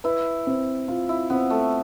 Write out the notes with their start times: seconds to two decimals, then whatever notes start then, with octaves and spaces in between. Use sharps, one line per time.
0.04 E4 B4
0.47 C4
0.88 F4
1.09 E4
1.30 B3 C4
1.50 A3